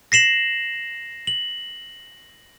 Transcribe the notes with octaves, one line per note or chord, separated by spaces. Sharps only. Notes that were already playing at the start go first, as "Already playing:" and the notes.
A#6 C7 E7 F#7
F#7